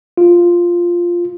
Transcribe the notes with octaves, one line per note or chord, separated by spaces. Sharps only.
F4